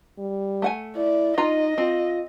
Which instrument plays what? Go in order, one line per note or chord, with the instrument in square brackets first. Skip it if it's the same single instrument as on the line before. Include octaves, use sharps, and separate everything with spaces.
[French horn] G3
[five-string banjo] A3 F#5 G#5
[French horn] E4 [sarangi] D5
[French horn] D#4 [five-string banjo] F4 A#5 [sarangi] D#5
[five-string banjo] C4 [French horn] F4